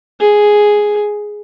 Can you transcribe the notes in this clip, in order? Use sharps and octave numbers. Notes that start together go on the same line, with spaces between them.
G#4